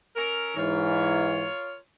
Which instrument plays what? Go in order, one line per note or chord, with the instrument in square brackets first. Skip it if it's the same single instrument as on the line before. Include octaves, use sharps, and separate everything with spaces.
[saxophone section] C#4 A4 A#4
[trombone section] G#2 E3 [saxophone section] F4 A#4 C#5